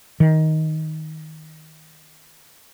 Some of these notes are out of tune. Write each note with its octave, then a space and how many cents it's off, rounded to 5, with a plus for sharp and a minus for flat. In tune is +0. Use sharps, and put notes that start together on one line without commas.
D#3 +10